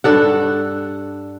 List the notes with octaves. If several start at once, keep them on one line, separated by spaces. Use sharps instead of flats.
G2 D4 A4 F#5